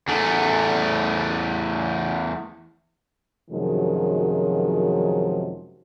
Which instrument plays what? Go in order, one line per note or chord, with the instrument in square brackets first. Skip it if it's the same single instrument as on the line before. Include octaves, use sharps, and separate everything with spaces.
[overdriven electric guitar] E2 A3
[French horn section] F#2 C3 D#3 F3 F#3 G#3